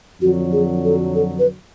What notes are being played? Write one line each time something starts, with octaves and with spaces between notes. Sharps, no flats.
F2 D3 F#3 F#4
G#4
A4
A4
B4